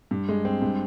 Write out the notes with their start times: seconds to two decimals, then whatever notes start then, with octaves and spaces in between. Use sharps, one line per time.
0.11 G2
0.29 G#3
0.45 C4
0.62 G2